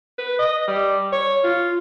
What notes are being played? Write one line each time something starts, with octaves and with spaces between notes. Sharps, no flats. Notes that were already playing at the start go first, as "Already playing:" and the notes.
B4
D#5
G3
C#5
F4